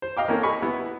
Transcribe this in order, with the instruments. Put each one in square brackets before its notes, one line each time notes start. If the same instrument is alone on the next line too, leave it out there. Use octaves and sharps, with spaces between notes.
[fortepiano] C5
D#5 F5 G5 D6
A#3 C4 C#4 A4 A#4
D#5 G#5 B5 C#6
B3 E4